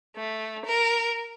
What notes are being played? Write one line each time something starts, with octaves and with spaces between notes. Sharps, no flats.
A3
A#4